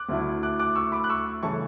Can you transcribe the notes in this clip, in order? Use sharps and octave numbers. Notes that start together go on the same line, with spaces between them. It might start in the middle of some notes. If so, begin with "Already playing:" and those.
Already playing: D6 F#6
D2 D3 A3 E4
D6 F#6
D6 F#6
C#6 E6
B5 D6
F#6
C#6 E6
C#3 E3 A3 E4 A5 C#6